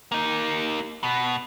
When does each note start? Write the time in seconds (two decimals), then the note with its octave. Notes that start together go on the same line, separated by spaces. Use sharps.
0.12 A#3 D#4
1.03 B2